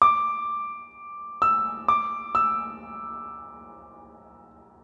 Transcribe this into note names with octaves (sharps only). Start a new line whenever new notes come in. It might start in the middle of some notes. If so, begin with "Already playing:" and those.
D6
E6
D6
E6